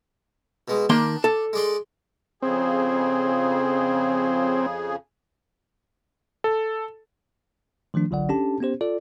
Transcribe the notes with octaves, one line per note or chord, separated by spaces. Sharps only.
B2 G#3
D#3 A#3 D4 C6
A4
G#3 D5 C6
F2 C#3 C4 G#4
A4
D#3 F3 A3 D4
G1 C2 D3 F#3 D5 F#5
C#4 D4 G4 A4 A5
B3 C#4 G4 C5
F4 A4 D5